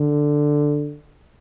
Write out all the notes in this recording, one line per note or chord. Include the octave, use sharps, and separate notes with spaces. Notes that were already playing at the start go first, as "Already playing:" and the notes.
Already playing: D3